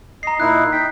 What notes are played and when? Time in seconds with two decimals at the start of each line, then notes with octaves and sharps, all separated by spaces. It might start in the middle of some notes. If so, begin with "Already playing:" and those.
0.23 D#5 A#5 C7
0.40 A#2 D#4 E4 F#6
0.72 D#4 G5 B6